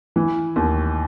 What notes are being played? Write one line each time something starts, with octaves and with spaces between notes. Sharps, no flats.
E3
D#2